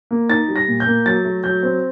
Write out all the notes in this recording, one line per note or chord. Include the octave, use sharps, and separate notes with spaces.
A#3
D#4 A6
G3
A#6
A#2
G6
A#3
F#3 A6
A3
F#3 G6
C4